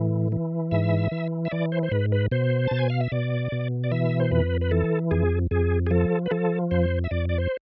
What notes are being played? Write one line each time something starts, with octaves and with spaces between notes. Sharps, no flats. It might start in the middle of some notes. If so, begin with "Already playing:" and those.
Already playing: A2 E3
E3
G#2 E5
E3
E5
E3 D5
C5
C5
G#2 B4
B4
B2 C5
B2 A5
G#5
F5
E5
B2 D5
B2
D5
E3 E5
C5
F2 B4
B4
E3 A4
F2 G#4
F2 G#4
G#4
F3 A4
B4
F3 A4
F2 C5
E5
F2 D5
D5
C5